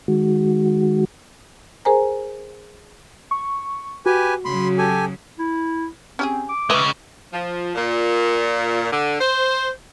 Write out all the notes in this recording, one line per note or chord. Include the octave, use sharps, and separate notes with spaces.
D#3 G#3 F#4
G#4 A#4 C5 G#5 A#5
C#6
F#4 G4 B4 G#5
C#3 F#3 B5 C6
G4 A4 G#5
E4
C4 C#4 G4 G#4
D6
C#3 G#3 B4 E5
F3
A#2
D3
C5